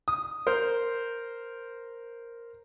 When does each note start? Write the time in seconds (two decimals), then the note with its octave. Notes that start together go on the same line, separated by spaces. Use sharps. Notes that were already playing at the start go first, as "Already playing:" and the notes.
0.08 D#6
0.47 A#4 C5